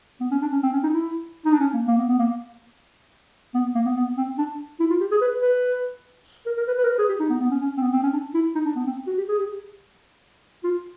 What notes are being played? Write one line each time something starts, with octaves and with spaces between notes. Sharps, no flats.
B3
C#4
D4
C#4
C4
C#4
D#4
E4
D#4
D4
C#4
A#3
A#3
B3
B3
A#3
B3
A#3
B3
B3
C4
D4
E4
F4
G4
G#4
B4
B4
A#4
A#4
B4
B4
A#4
B4
G#4
G4
D#4
B3
B3
C#4
C#4
C4
B3
C4
C#4
D4
E4
D#4
D4
B3
C4
F#4
G4
G#4
G4
F4